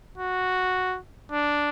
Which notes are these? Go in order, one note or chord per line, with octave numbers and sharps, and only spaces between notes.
F#4
D4